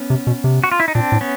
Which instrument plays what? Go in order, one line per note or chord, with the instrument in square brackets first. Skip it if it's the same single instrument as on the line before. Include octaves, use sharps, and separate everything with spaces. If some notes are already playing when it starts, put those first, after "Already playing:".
Already playing: [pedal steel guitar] B3 C#4
[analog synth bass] C3
B2
C3
[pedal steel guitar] F#4
F4
E4
D#4
[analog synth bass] A#2 [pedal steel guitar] C4 D4
[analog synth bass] A2
[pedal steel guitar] B3 C#4